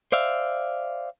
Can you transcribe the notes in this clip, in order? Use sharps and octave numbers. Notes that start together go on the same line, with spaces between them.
C5 D5 E5 F5